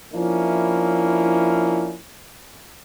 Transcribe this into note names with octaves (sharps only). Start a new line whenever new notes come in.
F3 A#3 C#4 D4 E4